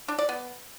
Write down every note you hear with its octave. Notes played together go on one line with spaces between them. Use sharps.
D4
D5
B3